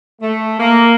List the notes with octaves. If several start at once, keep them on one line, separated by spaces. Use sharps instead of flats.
A3
A#3